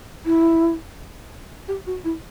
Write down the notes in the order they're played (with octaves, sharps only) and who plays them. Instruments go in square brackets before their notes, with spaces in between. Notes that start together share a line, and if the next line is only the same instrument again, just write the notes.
[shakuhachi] E4
G4
F#4
E4